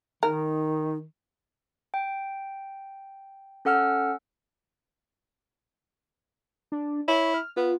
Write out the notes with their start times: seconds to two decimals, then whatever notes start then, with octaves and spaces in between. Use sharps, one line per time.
0.23 D#3 D#4 A#4
1.94 G5
3.65 C#4 A4 F#5 E6 F6
6.72 D4
7.08 E4 C#5
7.34 F6
7.57 B3 F4